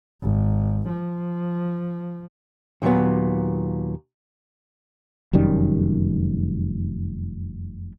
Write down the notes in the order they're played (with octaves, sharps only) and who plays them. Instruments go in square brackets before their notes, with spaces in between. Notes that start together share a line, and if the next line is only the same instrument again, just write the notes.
[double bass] G#1
F3
[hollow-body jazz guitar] D#2 A#2 F3 F#3 B3
[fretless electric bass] F1 F#2 D#3 G3